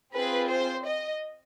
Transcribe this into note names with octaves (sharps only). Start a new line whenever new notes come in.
C4 F4 G#4 B4
C5
D#5